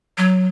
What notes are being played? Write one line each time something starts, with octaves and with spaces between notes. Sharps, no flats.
F#3